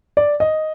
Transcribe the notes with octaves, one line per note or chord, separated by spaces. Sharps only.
D5
D#5